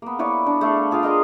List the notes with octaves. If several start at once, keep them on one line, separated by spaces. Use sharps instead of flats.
A#3 B3
E4 B4 C#5 D5
D4
A3 A4 F5
F4 G#4 D5 F5
A#4 D#5 A#5 C6